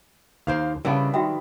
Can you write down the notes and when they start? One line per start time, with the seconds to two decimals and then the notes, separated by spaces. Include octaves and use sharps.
0.47 D#2 A#3 C5 F5
0.85 C#3 G3 B3 D4 E4 A#4 F5
1.14 D#3 F#4 E5 G5